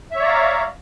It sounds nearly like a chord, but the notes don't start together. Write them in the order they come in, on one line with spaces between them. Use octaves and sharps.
E5 C#5 D5 A#5 F5